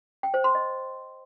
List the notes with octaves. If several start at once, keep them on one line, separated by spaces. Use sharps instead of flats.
G5
C5
C6
D#5